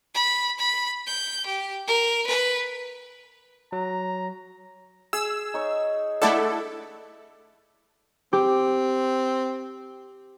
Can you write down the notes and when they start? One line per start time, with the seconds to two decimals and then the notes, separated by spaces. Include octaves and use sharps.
0.14 B5
0.59 B5
1.07 G6
1.46 G4
1.87 A#4
2.26 B4
3.72 F#3 A#5
5.13 G#4 E6
5.54 D#4 C#5
6.22 A3 D4 E4 A4 D5 F#5
8.33 C4 G4